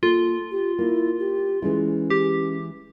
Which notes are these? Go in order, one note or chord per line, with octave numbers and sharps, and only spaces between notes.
A#3 F4 A4
G4
A#3 E4
G4
E3 G#3 C#4 E4
G4